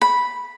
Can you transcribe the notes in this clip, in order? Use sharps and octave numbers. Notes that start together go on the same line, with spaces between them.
B5